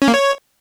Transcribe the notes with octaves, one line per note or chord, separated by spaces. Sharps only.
C#4
A#3
C#5